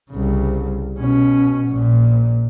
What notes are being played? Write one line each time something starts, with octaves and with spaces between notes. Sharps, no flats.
C2 C#3
B2 C#4
A#1 A#2